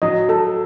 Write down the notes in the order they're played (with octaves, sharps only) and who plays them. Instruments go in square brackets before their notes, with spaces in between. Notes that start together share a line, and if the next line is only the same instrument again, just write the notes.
[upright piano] F#3 [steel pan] D#5
[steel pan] A4